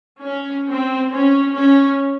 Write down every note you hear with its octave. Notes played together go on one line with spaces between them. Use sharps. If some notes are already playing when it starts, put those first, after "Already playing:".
C#4
C4
C#4
C#4